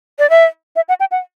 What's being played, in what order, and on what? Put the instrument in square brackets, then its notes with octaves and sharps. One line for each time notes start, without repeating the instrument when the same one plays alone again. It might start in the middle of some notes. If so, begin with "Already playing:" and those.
[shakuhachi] D5
E5
E5
F#5
G5
F#5